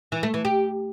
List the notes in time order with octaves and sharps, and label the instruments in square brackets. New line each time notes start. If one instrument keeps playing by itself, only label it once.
[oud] E3
A3
E3
G4